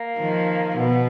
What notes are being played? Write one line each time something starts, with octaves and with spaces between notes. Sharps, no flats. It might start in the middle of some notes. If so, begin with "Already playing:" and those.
Already playing: A#3
D#3 F3
B2 B3